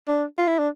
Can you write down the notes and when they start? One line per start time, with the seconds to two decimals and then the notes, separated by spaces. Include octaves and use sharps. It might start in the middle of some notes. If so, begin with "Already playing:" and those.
0.08 D4
0.38 F4
0.48 E4
0.58 D4